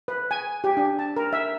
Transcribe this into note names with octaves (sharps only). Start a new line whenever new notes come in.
B4
G#5
G4
D4
A5
A#4
E5